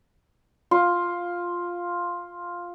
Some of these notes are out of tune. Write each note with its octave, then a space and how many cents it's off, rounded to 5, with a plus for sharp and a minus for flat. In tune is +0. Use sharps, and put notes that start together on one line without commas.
F4 +5